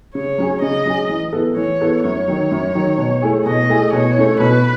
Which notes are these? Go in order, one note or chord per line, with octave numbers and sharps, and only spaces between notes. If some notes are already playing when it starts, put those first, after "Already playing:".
C#3 C#5
F#3 C#4 G#4
C#3 D#5
F#3 C#4 G#4
E3
B3 E4 A4
E3 C#5
B3 E4 A4
F#2 C#5
D#3 F#3
F#2
D#3 F#3
B2
A3 E4 G#4
B2 D#5
A3 E4 G#4
B2 C#5
A3 C#4 E4
B2 B4